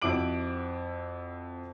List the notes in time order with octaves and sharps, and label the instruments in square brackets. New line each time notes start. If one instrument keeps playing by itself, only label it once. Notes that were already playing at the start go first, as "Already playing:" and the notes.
[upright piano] F2 E4 F#4 D6 D7 F#7